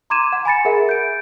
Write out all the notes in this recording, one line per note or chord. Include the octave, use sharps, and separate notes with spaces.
A#5 C6 D6 G#6 D#7 E7
F#5
G#5 B5 A6 C#7
G#4 A#4 E5 F#5
G6 D7